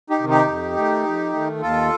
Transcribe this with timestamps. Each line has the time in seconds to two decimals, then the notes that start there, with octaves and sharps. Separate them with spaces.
0.10 D#4 G4
0.19 C3 D#3
0.29 D#4 G4
0.47 F2
0.77 D#3 A3
1.04 F2
1.33 D#3 A3
1.61 D#2 F4 A4